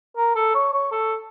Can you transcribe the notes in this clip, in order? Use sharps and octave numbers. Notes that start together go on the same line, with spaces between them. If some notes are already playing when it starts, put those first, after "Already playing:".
A#4
A4
C#5
C#5
A4